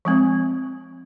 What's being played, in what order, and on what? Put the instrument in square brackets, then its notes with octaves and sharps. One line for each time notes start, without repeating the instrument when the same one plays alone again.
[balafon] F3 G#3 C4